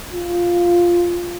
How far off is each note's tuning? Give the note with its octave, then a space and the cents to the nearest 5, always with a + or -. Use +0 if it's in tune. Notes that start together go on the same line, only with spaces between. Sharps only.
F4 +0